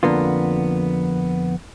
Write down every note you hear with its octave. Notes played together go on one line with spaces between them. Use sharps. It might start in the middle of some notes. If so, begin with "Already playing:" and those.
F2 D3 A#3 B3 F4